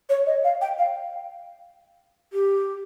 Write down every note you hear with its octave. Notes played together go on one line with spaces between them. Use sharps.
C#5
D#5
F5
G5
F5
G4